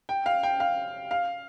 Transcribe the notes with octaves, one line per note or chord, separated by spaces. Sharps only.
G5
F5
G5
F5
F5